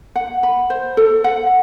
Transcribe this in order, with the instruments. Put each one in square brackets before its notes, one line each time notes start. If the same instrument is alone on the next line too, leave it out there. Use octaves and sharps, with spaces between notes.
[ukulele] F#5
B5
C5
A4
F#5